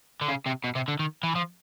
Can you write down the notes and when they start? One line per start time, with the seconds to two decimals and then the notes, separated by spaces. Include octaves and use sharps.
0.21 D3
0.29 C#3
0.46 C3
0.64 B2
0.75 C3
0.88 D3
0.99 D#3
1.23 E3
1.35 F3